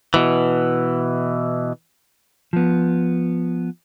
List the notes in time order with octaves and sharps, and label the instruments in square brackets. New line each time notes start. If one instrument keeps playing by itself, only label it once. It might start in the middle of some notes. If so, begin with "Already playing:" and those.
[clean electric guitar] B2 E3
F3 B3